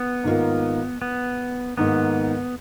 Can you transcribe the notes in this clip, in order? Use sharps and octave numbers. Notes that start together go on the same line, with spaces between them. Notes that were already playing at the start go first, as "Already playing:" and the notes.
Already playing: B3
G#2 D#3 A#3 F4 A#4
B3
G#2 D#3 A#3 B3